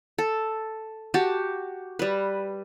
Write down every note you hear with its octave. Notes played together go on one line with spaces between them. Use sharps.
A4
F#4 G4 A5
G3 B4